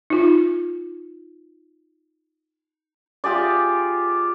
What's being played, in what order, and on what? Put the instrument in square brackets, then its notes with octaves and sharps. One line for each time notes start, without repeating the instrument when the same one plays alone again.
[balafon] D#4 F4
[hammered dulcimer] F4 G4 G#4 D5